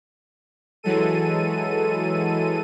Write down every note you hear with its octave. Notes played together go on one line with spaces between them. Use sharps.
E3 F#3 G#3 A4 D#7